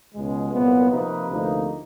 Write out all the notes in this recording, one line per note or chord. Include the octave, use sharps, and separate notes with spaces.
C#2 B2 G#3
C2 A#2 F#3 B3
C3 F3 A#3 D#4 B4
D2 C3 F3 A#3 D#4